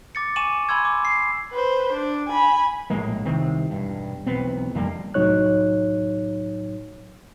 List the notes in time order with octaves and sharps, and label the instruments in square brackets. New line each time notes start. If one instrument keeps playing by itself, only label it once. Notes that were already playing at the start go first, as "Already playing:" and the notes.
[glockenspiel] D6 A6 C#7
G#5 C#6 D6 D#7 E7 F#7
G#5 B5 C6 E6 G#6
D6
C7
[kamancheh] B4 C5
D4
G#5 B5
[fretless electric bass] A#1 A2 G#3 A#3
C2 C3 D#3 C4
E1 G2
E1 B1 B3 C4
F2 D3 G3 A#3
[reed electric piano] C2 A2 F#3 D#4 C#5 F#6